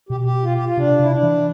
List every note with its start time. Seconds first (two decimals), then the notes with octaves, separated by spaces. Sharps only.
0.09 B2 G4
0.24 G4
0.43 F4
0.54 G4
0.65 F4
0.77 C3 D4
0.99 C3 E4
1.11 D4
1.23 E3